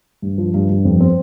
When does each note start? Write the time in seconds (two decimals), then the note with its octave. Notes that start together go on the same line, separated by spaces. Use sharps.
0.22 G2
0.38 F3
0.54 G2
0.70 G2
0.85 F2
1.00 C4